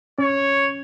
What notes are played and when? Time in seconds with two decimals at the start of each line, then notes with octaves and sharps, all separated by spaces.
0.18 C#4 C#5